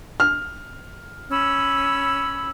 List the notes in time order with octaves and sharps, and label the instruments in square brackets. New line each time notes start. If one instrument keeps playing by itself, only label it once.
[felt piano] F6
[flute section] C#4 B5 E6